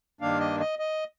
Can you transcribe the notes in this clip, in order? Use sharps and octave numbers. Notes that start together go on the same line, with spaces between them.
G2 D#3 A#3 D4 F5
D#5
D#5
D#5